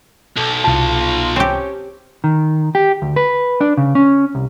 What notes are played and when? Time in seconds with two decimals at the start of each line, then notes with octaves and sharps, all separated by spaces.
0.37 B1 A4
0.64 C2 F4 A5
1.36 C4 C#4 G4
2.24 D#3
2.75 G4
3.02 D2
3.16 B4
3.61 D4
3.77 C#3
3.95 C#4
4.35 C2